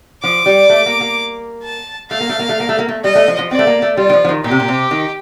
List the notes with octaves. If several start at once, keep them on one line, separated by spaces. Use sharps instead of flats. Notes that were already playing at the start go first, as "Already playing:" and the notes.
F3 D6
G3
A3
A#3
A#3
A5
A3 F5
A#3
A3
A#3
A3
A#3
A3
A#3
A3
G3 D#5
A3
F3
F3
C4 D5
A3
A#3
A3
G3 F4
D#3
F3
F3
D#3
A#2 G4
C3
A#2
C3
D#3